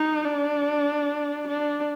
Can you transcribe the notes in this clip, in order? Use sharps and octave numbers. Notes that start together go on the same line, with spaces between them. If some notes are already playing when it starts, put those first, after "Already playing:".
Already playing: D#4
D4
D4